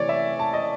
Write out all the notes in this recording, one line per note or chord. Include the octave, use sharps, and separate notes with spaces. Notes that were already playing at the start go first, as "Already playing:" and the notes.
Already playing: C3 E3 A3 C#5 D5
E5
A5
D#5